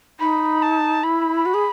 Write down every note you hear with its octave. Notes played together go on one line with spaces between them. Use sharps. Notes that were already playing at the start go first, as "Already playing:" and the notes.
D#4 B5
A5
E4 B5
F#4
G#4